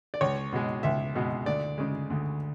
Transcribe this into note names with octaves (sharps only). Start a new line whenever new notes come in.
D5
C#2 C#5
B2 G#3
C#2 E5
B2 G#3
D2 D5
C#3 G#3
D2